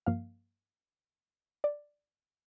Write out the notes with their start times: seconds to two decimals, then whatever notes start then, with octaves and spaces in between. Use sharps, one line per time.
0.06 G2 F3 A#3 F5
1.64 D5